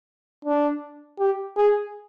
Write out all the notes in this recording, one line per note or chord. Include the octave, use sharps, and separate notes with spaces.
D4
G4
G#4